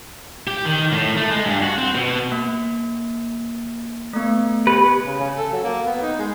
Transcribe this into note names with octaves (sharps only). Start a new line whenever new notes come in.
G4
D#3
A2
A3
G#3
G2
F#4
C4
B2
A#3
A3 B3
G4 B4
C#3
C#3
A4
F#3
A#3
B3
D#4
G#3